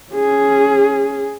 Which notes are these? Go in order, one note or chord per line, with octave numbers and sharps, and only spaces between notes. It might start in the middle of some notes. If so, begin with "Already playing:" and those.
C#4 G#4